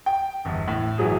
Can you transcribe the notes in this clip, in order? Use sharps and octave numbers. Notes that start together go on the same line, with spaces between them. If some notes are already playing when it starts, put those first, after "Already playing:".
G5
G1 E2
A2
G1 E3 F#3 G#4